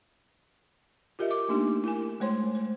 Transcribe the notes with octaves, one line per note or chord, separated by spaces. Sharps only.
F4 G4 A#4 D#5 E5
D6
A3 A#3 D4 D#4 G4
E4 A#4 G#5
G#3 A3 C5 C#5 C6
C5